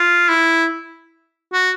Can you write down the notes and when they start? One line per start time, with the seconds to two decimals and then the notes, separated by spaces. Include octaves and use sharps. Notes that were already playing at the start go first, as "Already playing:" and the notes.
Already playing: F4
0.29 E4
1.53 F#4